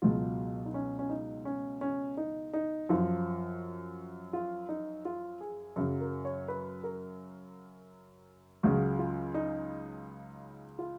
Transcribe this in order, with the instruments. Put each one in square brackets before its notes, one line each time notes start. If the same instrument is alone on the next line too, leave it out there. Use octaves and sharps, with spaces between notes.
[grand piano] C#2 B2 F#3 F4
D#4
C#4
C#4
D#4
C#4
C#4
D#4
D#4
F#2 F3 F4
F4
D#4
F4
G#4
F#2 C#3 F#3
A#4
C#5
B4
A#4
C#2 C#3 F#3 F#4
F4
D#4
F4